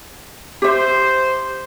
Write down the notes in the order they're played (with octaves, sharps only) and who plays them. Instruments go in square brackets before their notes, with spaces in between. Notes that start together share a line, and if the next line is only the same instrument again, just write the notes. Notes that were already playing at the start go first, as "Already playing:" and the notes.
[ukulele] G4 E5 [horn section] C5